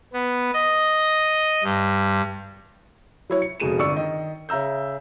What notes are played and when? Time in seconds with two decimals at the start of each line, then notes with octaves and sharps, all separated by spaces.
0.13 B3
0.53 D#5
1.63 G2
3.30 F#3 E4 C#5
3.42 C#7
3.60 F1 B2 G#3 D#7 E7
3.79 G1 D5 C#6 E6 C#7
3.96 D#3 D#5
4.49 C#3 E5 A#5 E6 G6